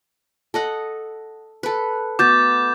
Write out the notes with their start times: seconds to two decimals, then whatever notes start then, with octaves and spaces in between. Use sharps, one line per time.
0.54 A4 D#5 F#5
1.63 A4 B4
2.19 A3 B3 F#4 D6 G6 A6